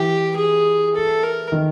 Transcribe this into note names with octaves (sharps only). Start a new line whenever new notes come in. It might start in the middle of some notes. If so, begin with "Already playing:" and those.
Already playing: E3 G4
G#4
A4
A#4
D#3